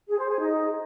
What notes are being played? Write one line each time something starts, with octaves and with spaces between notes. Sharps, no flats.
G#4
C5
G#4
D#4